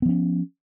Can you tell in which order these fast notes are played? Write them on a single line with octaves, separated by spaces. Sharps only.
B3 F3 C#4